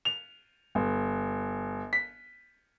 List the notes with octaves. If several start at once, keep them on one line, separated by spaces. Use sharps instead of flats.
F7
G1
B6